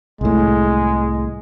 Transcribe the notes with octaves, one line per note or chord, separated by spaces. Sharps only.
C2 A2 G#3